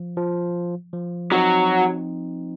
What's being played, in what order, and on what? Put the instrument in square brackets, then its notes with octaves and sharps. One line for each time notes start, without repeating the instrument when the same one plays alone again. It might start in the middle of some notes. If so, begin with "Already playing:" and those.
Already playing: [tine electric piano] F3
F3
F3
[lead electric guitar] F#3 [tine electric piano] C4 D#4